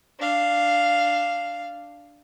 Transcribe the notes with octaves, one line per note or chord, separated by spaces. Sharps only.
D4 F5